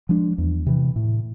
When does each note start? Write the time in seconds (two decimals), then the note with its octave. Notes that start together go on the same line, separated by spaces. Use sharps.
0.09 F3 G#3 D4
0.38 E2
0.66 C3 E3
0.96 A2